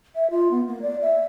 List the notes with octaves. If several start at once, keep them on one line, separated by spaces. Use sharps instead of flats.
E5
F4
B3
A#3
D5
E5